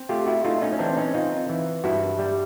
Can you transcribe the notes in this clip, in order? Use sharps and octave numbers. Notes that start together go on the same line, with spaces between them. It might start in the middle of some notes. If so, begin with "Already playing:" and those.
Already playing: C4
A3 F4 G4
E4 F#4
A3 D#4 F4
C#4 D#4
C#4
E3 C4 D4
C#4 D#4
C4 D#4 F4
E3
G2 E4 F#4
G3